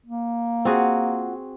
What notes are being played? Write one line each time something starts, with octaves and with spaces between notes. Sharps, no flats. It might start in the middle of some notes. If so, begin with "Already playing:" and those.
A#3
C4 F4 F#4 G#4 F#5